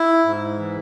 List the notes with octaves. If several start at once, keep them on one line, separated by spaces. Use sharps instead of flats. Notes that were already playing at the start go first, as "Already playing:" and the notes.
Already playing: E4
G#2
E3